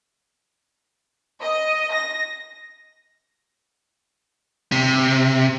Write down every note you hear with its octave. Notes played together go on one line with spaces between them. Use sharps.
D#5
A#6
C3